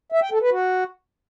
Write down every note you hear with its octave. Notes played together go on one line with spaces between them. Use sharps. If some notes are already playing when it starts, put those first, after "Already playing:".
E5
G5
A4
B4
F#4